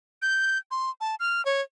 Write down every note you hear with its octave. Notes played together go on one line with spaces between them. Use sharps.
G6
C6
A5
F6
C#5